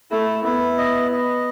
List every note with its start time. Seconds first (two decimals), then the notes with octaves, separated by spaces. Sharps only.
0.11 A3 E4
0.44 B3 E4
0.78 D#5
1.12 D#5